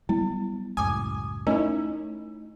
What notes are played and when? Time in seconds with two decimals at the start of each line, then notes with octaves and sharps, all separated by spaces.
0.09 F#3 G3 B3 E4
0.77 C#2 F#2 A2 G#5 D6 D#6
1.47 A3 C#4 D#4 E4 A#4